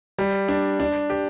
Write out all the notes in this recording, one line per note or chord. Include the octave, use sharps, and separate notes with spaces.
G3
D4
D4
G4